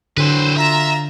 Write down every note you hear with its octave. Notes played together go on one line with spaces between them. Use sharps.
D3 E3 F#3 C4 B4 C5
F4 E5 A#5